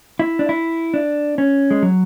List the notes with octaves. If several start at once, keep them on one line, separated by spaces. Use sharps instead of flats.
E4
D4
E4
D4
C#4
G#3
F#3